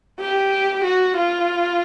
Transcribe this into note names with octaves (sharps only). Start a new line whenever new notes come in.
G4
F#4
F4